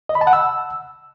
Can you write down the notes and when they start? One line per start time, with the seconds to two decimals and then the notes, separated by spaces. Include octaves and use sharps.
0.09 D#5
0.15 B5
0.21 A5
0.27 F#5
0.33 E6